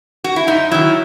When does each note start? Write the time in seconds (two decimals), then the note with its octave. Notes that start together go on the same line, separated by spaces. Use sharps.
0.24 F#4
0.36 E4
0.47 F#2 D#4
0.71 D#3 F#3 E4